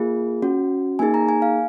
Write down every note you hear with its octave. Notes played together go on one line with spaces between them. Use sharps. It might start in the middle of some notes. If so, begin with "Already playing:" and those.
Already playing: A#3 F4 G#4
C#4 F#4
A#3 D#4 G#4 G#5
A#5
G#5
F5